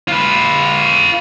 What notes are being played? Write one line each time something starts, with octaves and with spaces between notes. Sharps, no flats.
F4 B4